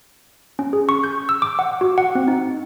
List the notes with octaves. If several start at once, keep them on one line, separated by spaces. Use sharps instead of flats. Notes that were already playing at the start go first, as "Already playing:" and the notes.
C#4
G#4
C#6
G6
E6
D6
F#5
F#4
F#5
C4
D#4